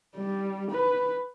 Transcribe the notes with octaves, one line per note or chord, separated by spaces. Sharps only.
G3
B4